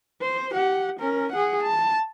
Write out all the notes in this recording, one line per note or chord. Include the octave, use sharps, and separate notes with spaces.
C5
G4 F#5
C#4 A#4
G#4 F#5
A5